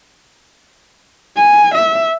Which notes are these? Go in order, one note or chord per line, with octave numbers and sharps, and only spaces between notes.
G#5
E5